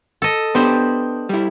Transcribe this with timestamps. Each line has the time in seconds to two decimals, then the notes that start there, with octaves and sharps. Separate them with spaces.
0.22 A4 D#5
0.55 B3 D4 G4 C5
1.29 G3 E4